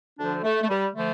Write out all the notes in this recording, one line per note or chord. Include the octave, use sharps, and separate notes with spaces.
D2 D3 F3 D4
A3
A3
G3
D3 F3 A3